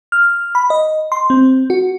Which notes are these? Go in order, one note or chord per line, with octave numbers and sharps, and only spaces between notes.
F6
B5
D#5
C6
C4
F#4